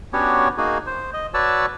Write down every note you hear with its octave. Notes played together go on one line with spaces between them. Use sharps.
B3 C#4 D4 F#4 G4 C#5
A#3 D#4 F#4 G#4
C5
D#5
F#4 B4 C#5 D5 A5 E6